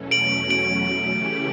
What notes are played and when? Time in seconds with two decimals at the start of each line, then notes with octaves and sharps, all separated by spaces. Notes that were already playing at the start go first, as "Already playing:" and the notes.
Already playing: E2 B2 F#3 A3 C#4
0.11 D7 F#7
0.50 D7 F#7
1.10 C#3 E3 A3 C#4 G4